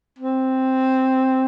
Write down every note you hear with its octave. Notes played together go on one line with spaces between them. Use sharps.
C4